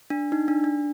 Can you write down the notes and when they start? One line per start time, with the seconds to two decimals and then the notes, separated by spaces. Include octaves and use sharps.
0.10 D4
0.32 D#4
0.48 D4
0.64 D4